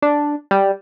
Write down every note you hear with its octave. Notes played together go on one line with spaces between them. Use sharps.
D4
G3